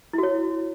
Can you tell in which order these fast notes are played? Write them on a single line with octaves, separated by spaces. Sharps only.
E4 F#4 C#5